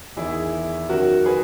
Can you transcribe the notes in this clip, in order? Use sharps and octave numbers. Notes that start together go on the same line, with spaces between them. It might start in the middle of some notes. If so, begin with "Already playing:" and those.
E2 D#3 E4 G#4
F#2 D#3 F#4 A#4
G#4 B4